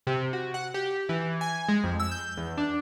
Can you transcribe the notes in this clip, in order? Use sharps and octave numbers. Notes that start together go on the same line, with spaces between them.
C3
F#4
F#5
G4
E3
G#5
G#3
F2
E6
G6
E2
D4